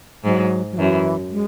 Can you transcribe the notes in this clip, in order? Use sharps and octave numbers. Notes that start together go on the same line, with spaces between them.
G#2 F#3
F#3
F#2 E3
G#3